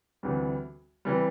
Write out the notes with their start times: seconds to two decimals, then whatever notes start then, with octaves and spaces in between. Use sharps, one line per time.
0.23 D2 C3 E3 G3
1.05 C3 E3 G3